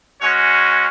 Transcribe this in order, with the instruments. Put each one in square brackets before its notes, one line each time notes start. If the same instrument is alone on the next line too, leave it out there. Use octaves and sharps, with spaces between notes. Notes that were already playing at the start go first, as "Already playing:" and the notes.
[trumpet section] G#3 C#4 F#4 C#5